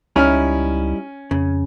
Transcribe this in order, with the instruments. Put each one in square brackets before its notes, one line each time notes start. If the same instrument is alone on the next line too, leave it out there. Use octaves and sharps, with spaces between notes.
[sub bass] C#2 [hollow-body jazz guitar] G3 D#4 E4 [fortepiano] C#4 F6
[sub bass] F2 [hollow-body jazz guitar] C#3